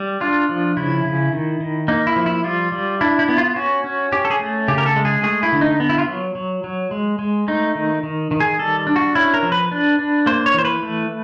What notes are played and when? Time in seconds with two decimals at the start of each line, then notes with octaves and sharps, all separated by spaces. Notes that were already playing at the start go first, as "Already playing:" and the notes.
Already playing: G3
0.21 D4 F4
0.49 F3
0.77 C#3 E4
1.05 C#3
1.32 D#3
1.60 D#3
1.88 A#3 D#4
2.07 E4
2.16 F3
2.26 E4
2.44 G3 F4
2.72 G3
3.01 D4 E4
3.19 E4
3.29 B3
3.38 F4
3.56 C#4 F#4
3.84 C#4
4.12 C#4 G4
4.25 A4
4.31 G#4
4.40 A3
4.68 C#3 G4
4.78 A#4
4.86 A4
4.96 G#3
5.05 G#4
5.23 A3 G#4
5.43 E4
5.52 D3
5.61 D#4
5.80 B3
5.89 E4
5.98 F4
6.08 F#3
6.35 F#3
6.64 F#3
6.91 G#3
7.19 G#3
7.48 A3 D#4
7.75 D#3
8.03 D#3
8.31 D#3
8.40 G#4
8.59 G3 A4
8.87 D4
8.96 F#4
9.15 C#4 E4
9.34 A#4
9.43 F3
9.52 B4
9.72 D4
9.99 D4
10.26 A#3 C5
10.46 C#5
10.54 E3 C5
10.65 B4
10.83 A3